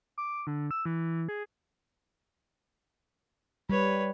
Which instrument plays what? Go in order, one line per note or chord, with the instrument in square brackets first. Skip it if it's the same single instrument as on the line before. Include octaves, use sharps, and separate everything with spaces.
[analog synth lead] D6
D3
E6
E3
G#4
[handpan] G3 [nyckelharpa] B4 C#5